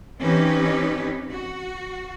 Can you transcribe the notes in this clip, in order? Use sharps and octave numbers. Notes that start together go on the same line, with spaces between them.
E3 C4 C#4 D#4 G4 B4
F#4